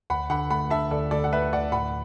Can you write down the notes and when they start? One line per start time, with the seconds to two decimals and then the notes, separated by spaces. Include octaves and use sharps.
0.10 D2 F#5 B5
0.30 D3 F#5 B5
0.50 A3 F#5 B5
0.70 D3 E5 A5
0.91 D2 A4 D5
1.11 D2 A4 D5
1.24 F#5
1.32 D2 B4 E5
1.52 D2 D5 F#5
1.72 A2 F#5 B5